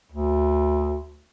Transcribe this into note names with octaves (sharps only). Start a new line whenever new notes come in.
D2